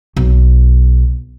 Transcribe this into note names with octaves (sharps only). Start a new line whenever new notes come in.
B1